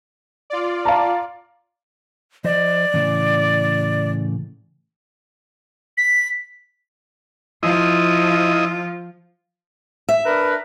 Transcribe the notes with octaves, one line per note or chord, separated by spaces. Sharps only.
F4 D5
F5 A5 A#5
F3 C5 D5 D#5
A2 C#3 E3
B6
F3 E4 F4 D#5
E5
D4 A#4 B4